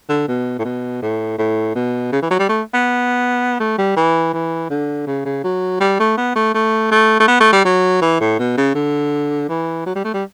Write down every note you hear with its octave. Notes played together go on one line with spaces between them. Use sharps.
D3
B2
A2
B2
A2
A2
B2
C#3
E3
F#3
G3
A3
B3
A3
G3
E3
E3
D3
C#3
C#3
F#3
G3
A3
B3
A3
A3
A3
A3
B3
A3
G3
F#3
E3
A2
B2
C#3
D3
E3
F#3
G3
A3
G3